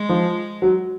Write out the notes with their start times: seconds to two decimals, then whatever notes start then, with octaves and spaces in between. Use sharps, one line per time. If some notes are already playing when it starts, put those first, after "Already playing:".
Already playing: G#3
0.09 F3
0.62 F#3